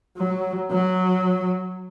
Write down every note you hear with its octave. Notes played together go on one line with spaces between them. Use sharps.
F#3
F#3